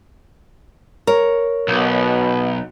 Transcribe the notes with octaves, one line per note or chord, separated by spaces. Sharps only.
A#4 C#5
B1 B2 B3